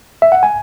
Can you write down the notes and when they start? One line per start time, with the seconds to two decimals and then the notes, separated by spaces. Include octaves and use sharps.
0.22 E5
0.32 F#5
0.43 G#5